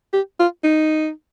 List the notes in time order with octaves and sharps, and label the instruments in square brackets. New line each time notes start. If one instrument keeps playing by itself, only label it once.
[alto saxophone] G4
F4
D#4